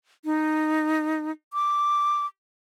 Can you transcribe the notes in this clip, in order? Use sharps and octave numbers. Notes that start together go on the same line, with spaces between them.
D#4
D6